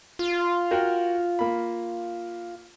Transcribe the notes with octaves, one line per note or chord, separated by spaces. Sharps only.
F4
F#4 A#4 G5
A#3 B5